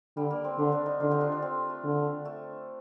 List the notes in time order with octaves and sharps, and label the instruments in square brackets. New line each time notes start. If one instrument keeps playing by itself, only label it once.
[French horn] D3 [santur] G3
[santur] A#3
C4
[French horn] D3 [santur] D4
[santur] D4
D#4
[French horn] D3 [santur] D4 F4
[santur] D#4 G4
D4 F4
D4
C4
A3
[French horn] D3
[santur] A3